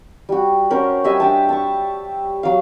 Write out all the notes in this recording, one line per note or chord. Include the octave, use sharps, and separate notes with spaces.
G3 F#4
C#4 A#4 C5 F#5
G3 D#5 E5 G#5
D4 G4 A5
A5 C#6
F#3 F5